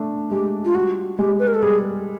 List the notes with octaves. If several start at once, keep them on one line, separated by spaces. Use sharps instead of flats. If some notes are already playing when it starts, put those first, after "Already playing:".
Already playing: A3 D4
G#3 G4
F4
G3 F#4
G#3 G4
B4
A#4
A4
G3 G#4